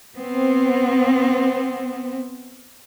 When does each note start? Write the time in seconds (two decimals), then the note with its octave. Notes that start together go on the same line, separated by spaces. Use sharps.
0.17 B3 C4